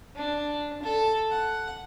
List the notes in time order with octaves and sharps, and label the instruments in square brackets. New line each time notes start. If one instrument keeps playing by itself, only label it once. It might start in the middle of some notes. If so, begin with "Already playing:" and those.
[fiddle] D4
A4
F#5